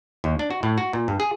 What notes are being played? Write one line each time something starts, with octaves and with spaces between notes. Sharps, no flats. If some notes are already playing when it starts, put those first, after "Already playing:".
D#2
D4
F#4
A2
F#4
A#2
G2
G#4